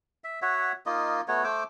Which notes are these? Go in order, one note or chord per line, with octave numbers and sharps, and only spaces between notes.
E5
F#4 C#5 E5 F#5
A#3 D#4 F4 D#5
A3 B3 F#4 C#5
A3 C5 D6 E6